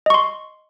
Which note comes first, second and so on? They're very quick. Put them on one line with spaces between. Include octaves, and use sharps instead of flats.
D#5 C#6 C6